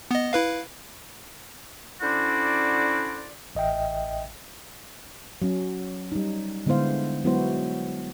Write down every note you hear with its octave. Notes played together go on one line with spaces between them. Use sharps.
B3 D#5
E4 B4 F5
D3 C#4 E4 F#4 C5 D5
A1 D#5 E5 G5
F#3 C#4
G3 D#4
D3 G#3 B3 E4 C5 F5
F#3 G#3 B3 E4 F#4 C5